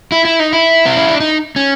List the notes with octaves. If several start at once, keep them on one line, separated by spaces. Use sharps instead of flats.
E4
E4
D#4
E4
C4
C#4
D4
D#4
C#4